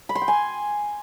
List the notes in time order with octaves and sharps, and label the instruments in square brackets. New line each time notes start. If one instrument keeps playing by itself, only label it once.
[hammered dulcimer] B5
C6
G5
G#5